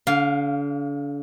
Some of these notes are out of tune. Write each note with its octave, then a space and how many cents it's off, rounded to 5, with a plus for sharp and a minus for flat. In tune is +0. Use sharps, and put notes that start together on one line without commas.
D3 -40 F5 +0